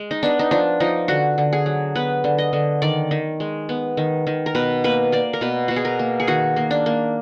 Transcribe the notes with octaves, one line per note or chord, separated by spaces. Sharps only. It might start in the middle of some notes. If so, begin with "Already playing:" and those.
Already playing: G#3
D#4
B3 D4
D#4
F3 D4
F3 D#4
D3 F#4
D3
G#4
F#3
B3 B4
D3
D#5
D3
D#3 D5
D#3
G#3
B3
D#3
D#3
A#4
B2 B4
A#3 B4
A#3 D5
A#4
B2 B4
B2 F#4
G#4
A#4
A#3
G#4
D#3 F#4
A#3
D4
A#3